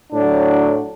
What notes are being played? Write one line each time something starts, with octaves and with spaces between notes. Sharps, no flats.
A2 F#3 D4